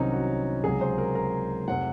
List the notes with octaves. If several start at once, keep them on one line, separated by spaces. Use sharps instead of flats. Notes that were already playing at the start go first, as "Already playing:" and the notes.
Already playing: C2 C3 D#3 F#3 C4 C#4 D#4
F#4
C#2 C3 F#3 G#4
C5
A#4
A#4
F1 C3 F#5